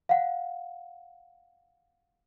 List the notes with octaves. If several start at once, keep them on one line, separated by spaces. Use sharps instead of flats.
F5 F#5